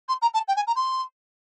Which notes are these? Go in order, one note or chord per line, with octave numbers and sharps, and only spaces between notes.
C6
A#5
A5
G5
G#5
A#5
C6